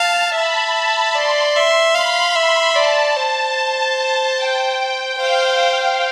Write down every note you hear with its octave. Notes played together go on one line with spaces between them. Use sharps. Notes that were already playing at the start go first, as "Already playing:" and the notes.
Already playing: F5 A5
E5 B5
D5 C6
E5
F5 B5
E5
D5 A5
C5
G5
C5 F5